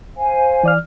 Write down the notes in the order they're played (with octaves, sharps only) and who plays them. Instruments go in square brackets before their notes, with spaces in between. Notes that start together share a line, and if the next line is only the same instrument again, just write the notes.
[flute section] C5 F5 G#5
[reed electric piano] E3 D5 F6